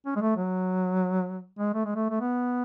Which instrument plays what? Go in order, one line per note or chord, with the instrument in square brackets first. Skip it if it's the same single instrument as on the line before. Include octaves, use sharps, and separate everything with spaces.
[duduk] C#4
G#3
A3
F#3
G#3
A3
G#3
A3
A3
B3